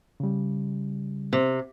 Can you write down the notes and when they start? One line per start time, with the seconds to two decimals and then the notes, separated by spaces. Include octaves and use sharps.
0.20 C#3 G3
1.33 C3